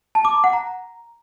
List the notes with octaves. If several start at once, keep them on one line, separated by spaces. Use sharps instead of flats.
A5
D6
A#5
F#5
A#5